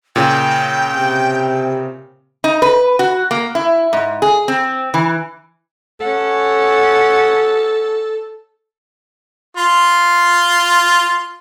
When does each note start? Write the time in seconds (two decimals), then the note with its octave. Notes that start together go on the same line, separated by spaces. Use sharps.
0.16 A#2 C#3 G5
0.94 C3
2.44 D#4
2.62 B4
2.99 F#4
3.31 A#3
3.55 E4
3.93 G#2
4.22 G#4
4.48 C4
4.94 E3
6.00 C#4 A4 F#5
9.57 F4 C6